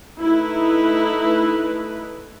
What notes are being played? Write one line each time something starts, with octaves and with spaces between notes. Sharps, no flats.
A3 D#4 E4 B4